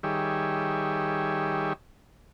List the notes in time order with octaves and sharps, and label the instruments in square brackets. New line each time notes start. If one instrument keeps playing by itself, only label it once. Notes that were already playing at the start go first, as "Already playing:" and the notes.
[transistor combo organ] D#3 G3 G4 G#4 C#5 E5